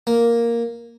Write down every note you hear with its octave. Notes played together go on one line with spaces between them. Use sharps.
A#3